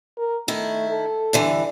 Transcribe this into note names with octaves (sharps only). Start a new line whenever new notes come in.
A#4
D#3 A3 E4
A4
G2 D3 E3